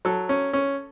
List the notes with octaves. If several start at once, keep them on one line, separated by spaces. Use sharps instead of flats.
F#3 A4
C#4
C#4